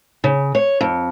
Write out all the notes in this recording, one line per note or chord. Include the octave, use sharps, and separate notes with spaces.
C#3
C#5
F2